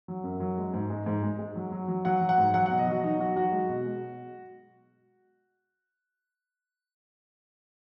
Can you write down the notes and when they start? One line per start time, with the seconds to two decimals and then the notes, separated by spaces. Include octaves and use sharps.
0.08 F#3
0.24 F#2
0.40 F#3
0.58 G#3
0.74 G#2
0.90 G#3
1.06 G#2
1.23 G#3
1.39 G#3
1.56 F#3
1.72 F#3
1.88 F#3
2.05 F#3 F#5
2.21 F#3
2.29 F#5
2.38 G#2
2.54 F#3 F#5
2.66 B2 F#5
2.79 D#5
2.87 F#3 F#4
3.03 F#3 D#4
3.20 F#3 F#4
3.36 F#3 F#4
3.52 G#3
3.69 B2
3.86 G#3